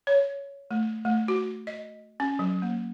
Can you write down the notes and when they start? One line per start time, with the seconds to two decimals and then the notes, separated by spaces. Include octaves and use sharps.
0.07 C#5
0.71 A3
1.05 A3
1.28 F#4
1.67 D#5
2.20 C#4
2.39 F#3
2.62 A#3